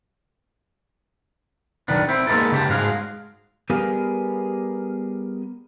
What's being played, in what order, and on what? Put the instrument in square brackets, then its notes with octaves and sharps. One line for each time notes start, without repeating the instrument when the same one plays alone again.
[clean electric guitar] B1 D#3 B3 D4
C4 E4
G#3 A#3 B3 D#4 A4
C#3 G4 A5
G#2 G#3 F#4 G#4 F5
[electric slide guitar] G3 B3 G4 G#4 A#4 F5